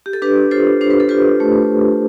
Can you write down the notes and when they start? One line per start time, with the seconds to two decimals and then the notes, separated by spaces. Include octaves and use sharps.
0.06 G4
0.13 A4
0.22 D4 G4 B4
0.51 F4 A4 C5
0.81 D4 C5
0.90 B4
1.00 A4
1.09 F4 G4 B4
1.40 A3